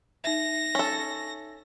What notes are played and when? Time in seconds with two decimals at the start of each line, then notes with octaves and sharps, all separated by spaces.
0.24 D#4 E5 A#6
0.75 C#4 A4